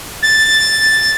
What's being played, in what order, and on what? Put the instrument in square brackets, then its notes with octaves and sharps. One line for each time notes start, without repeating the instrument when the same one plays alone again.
[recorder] A6